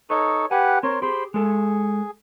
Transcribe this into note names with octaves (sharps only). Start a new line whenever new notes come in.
D#4 A4 B4 C#5 D#5 C#6
G4 B4 F#5 G#5
C4 A#4 C#5 C6
G4 G#4 C5 B5 C6
G#3 G#4 A4